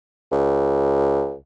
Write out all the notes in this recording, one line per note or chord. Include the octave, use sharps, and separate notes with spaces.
C#2